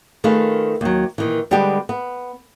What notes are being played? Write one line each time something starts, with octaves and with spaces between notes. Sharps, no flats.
D#3 A3 F4 G#4 B4
D#2 F#3
A#2 D#3 E3
D3 G3 G#3 B3 G4
B3